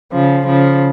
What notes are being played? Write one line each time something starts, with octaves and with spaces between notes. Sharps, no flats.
C#3 F3
C#3 F3